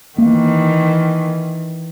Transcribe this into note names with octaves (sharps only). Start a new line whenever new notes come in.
D#3 E3 A#3